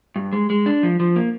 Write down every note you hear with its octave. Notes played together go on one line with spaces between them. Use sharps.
G2
G#3
G#3
D4
F3
F3
A#3